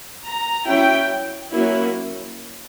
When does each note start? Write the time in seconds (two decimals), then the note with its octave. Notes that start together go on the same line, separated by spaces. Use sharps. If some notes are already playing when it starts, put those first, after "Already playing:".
0.24 A#5
0.66 F#3 C#4 E4 G5
1.52 F#3 A#3 C#4 E4